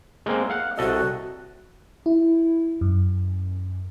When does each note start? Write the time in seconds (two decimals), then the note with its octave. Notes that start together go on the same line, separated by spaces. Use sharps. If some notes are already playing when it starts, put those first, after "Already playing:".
0.26 G#3 A#3 C4
0.50 F5 F#5
0.78 C2 F#4 A4 D#5
2.06 E4
2.81 F#2